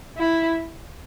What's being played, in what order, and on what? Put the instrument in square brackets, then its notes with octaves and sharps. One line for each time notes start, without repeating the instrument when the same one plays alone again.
[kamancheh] E4